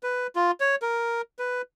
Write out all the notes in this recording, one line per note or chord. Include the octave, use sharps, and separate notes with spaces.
B4
F4
C#5
A#4
B4